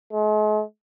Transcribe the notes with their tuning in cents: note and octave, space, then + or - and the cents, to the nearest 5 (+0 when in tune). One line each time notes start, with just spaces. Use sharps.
G#3 +45